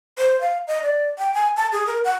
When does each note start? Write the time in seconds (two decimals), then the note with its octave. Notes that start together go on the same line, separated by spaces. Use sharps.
0.18 C5
0.41 F5
0.67 D#5
0.83 D5
1.19 G5
1.34 G#5
1.57 A5
1.72 G#4
1.87 A#4
2.04 F#5